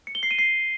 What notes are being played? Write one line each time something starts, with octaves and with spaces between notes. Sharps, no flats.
C#7
G7
C7
D#7
C7